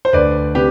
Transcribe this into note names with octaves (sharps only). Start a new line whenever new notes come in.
C5
D2 B4 D5
C3 G4 B4